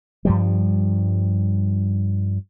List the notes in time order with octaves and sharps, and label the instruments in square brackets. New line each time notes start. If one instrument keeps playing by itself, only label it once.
[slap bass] G2 F3 G3